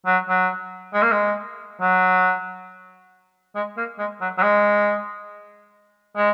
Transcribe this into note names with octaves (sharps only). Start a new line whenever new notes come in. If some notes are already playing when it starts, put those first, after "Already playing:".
F#3
F#3
G#3
A#3
G#3
F#3
G#3
A#3
G#3
F#3
F#3
G#3
G#3